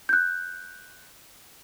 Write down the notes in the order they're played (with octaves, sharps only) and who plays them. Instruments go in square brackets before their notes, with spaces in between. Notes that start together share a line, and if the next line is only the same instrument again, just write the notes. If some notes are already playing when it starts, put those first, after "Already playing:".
[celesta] F#6 G6